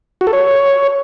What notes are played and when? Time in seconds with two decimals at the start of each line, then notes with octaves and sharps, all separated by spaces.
0.21 F#4
0.27 A4
0.33 C#5